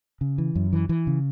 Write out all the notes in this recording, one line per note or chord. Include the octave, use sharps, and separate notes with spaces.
C#3
E3
F#2
E3
E3
C#3